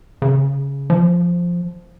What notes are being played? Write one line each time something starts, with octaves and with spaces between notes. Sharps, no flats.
C#3
F3